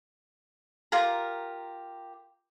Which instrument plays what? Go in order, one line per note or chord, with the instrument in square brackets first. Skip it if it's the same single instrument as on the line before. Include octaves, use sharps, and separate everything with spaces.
[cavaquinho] F4 G4 A#4 A#5